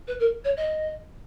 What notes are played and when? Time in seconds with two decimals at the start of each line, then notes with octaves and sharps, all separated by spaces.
0.07 B4
0.20 A#4
0.45 C#5
0.57 D#5